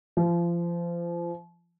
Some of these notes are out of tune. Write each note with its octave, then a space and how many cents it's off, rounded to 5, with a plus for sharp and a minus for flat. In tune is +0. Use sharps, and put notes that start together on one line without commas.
F3 -30